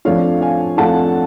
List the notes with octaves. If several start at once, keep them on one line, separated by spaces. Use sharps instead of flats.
F2 F3 A3 D4 F4 C#5 F5
F5 G#5
F2 F3 A3 D4 F4 F#5 A5